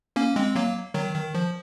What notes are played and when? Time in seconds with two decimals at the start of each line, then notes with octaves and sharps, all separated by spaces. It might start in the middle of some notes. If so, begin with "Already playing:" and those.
0.16 A#3 C#4
0.36 G#3 C4
0.55 F#3 A#3
0.94 D#3 F#3
1.15 D#3
1.35 F3